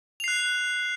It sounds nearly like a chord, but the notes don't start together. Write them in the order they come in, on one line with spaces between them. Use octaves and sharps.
F7 C7 F#6